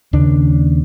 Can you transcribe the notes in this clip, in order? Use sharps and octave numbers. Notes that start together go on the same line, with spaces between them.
D#2 C#3 D4